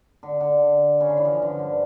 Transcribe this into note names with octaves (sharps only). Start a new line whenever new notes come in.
D3
D3
C#3
D3
E3
F3
D3
G2